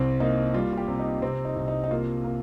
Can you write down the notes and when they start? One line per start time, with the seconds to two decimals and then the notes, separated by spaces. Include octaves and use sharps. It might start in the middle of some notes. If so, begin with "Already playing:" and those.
Already playing: C2 C4
0.20 A#3 D#4
0.54 G3 F4
0.73 F4
0.78 G4
0.88 C3
1.00 D#4
1.22 C3 C4
1.45 D#4
1.56 C2
1.68 D#4
1.84 D#4
1.91 A#3 F4
2.24 A#3